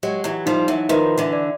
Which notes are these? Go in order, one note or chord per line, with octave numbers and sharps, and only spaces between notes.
F#3 G#3 G4
E3 F#3
F3 G3 D#4
E3 F#3
D#3 F3 B4
D3 E3
D5